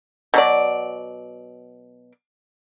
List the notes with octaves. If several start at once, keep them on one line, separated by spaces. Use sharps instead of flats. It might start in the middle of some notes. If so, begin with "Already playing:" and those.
B2 F#3 D5